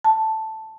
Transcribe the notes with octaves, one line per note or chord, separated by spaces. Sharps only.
A5